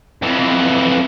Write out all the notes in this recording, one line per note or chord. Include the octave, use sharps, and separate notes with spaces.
F2 E3